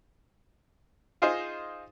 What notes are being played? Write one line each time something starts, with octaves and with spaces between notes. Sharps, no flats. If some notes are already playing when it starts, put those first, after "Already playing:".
D#4 F4 G#4 C5 D#5